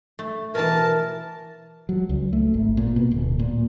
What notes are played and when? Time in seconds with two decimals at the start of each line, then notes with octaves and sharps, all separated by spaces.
0.19 A3
0.55 B2 E3 A#4 A5
1.89 F#3
2.09 C#2
2.33 A3
2.54 G#1
2.77 A#2
2.96 B2
3.11 D1
3.39 A#2